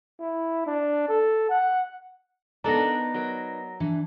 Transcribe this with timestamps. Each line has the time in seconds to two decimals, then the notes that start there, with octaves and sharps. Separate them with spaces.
0.19 E4
0.66 D4
1.08 A4
1.49 F#5
2.64 B3 D4 D#4 A4 A#4 D5 A#5 A#6
3.14 F#3 A#4
3.80 E3 D4